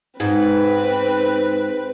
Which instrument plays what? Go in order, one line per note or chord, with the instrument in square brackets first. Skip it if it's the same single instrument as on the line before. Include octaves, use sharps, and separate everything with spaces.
[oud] G#2 [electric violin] C4 B4